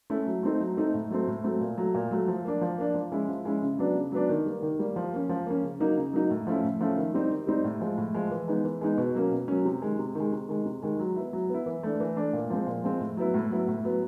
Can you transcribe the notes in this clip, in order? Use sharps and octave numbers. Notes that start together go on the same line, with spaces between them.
A3 C#4 E4
F#3
A3 C4 D#4
F#3
A3 C4 D#4
A2
F#3 A3 C4
A2
F#3 A3 C4
A#2
F#3 A3
A#2
F#3 A3
F3
A#3 D4
F3
A#3 D4
F3
G#3 C#4 E4
F3
G#3 C#4 E4
C#3
F#3 B3 D4
C#3
F#3 B3 D4
D#3
G3 A#3
D#3
G3 A#3
F3
A#3 C#4
F3
A#3 C#4
C#3
F#3 A#3 D#4
C#3
F#3 A#3 D#4
A2
F3 A3 C#4 E4
A2
F3 A3 C#4 E4
D#3
G3 C4 D#4
D#3
G3 C4 D#4
A2
F3 G#3
A2
F3 G#3
E3
G#3 B3 D#4
E3
G#3 B3 D#4
B2
F#3 A#3 C#4
B2
F#3 A#3 C#4
C3
D#3 G#3
C3
D#3 G#3
C3
D#3 G#3
C3
D#3 G#3
F#3
B3 E4
F#3
B3 E4
E3
A3 D4
E3
A3 D4
A#2
F3 G#3 C4
A#2
F3 G#3 C4
A2
F#3 B3 E4
A2
F#3 B3 E4
A2
F#3 B3